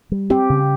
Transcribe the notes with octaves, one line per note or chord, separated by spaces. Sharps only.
G3
C4 G4
C#3